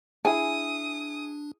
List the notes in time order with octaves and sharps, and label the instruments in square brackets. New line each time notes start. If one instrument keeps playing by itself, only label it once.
[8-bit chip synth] D4 [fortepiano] E4 G#4 [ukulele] G#5 [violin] D#6